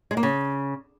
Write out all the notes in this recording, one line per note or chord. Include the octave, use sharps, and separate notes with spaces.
G#3
A#3
C#3